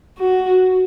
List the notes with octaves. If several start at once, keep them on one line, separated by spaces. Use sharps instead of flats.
F#4